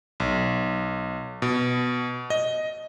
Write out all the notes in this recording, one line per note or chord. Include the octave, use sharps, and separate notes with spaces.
B1
B2
D#5